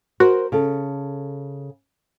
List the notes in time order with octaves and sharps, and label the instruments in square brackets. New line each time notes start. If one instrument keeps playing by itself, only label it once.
[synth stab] F#4 [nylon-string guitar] A#4 C5
[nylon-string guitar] C#3 A4